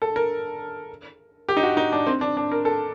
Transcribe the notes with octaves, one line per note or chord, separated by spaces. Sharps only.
A4
A#4
G4
D#4
F#4
D#4
D4
C4
D4
D4
A#4
A4